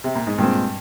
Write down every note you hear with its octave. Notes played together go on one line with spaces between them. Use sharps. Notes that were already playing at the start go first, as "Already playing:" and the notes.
C3
A#2
G#2
G2 A#2 G#3 C4